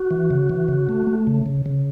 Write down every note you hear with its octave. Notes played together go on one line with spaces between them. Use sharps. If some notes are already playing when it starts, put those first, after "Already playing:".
Already playing: F#4
E3
C#3
E3
C#3
A3
A3
C#3
C#3
C#3